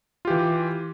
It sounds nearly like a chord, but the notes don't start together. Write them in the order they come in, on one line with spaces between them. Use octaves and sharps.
F4 G4 E3